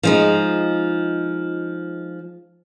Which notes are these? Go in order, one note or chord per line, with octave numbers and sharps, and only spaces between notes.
F3 G#3 D#4